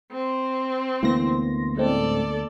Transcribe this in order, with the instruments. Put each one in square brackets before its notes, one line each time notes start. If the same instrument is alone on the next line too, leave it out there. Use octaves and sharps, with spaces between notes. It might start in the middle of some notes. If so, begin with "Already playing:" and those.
[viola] C4
[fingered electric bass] D2 A#3 B3 [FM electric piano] E3 C6 A#6
[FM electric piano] A2 G#3 C4 [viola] A4 D5